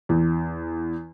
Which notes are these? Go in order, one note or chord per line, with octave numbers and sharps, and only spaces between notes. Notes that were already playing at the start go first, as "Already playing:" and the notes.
E2